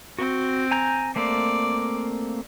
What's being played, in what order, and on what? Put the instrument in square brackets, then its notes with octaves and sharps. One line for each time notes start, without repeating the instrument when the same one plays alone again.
[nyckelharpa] C4 [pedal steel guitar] F#4
[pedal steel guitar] G#5 A#5 G6
[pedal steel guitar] A3 A#3 C4 [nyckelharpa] D5